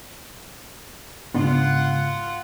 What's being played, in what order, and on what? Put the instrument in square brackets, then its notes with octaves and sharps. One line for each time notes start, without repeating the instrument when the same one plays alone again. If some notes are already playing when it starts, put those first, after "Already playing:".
[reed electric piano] G#2 C#3 [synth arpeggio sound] B3 D4 [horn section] F4 F#5